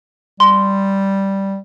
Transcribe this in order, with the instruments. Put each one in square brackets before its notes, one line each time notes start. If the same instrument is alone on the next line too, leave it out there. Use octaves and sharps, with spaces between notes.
[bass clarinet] G3 [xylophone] C6